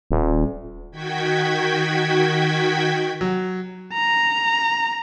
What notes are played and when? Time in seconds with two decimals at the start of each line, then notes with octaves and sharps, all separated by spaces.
0.11 D#1
0.91 D#3 F#4 G5 G#6 B6
3.21 F#3
3.93 A#5